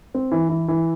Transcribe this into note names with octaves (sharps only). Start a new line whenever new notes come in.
C4
E3
E3
E3